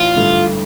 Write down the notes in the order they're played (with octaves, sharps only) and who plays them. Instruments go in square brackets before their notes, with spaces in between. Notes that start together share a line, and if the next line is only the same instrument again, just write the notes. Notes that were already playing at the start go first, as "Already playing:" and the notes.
Already playing: [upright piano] A1 [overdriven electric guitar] F4
[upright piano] G2 D3 A3